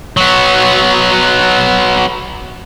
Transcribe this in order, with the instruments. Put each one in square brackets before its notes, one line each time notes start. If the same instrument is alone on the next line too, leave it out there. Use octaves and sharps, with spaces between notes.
[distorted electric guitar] F#3 B3